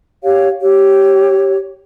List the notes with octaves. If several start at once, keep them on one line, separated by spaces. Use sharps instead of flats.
G4 C#5 F5
G4 C#5